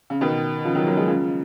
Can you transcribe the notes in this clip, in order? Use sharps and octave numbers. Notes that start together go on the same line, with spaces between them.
C#3
B2 D#3
C#3 F3
D#3 F#3
F#3 A#3
F3 G#3
C#3 F3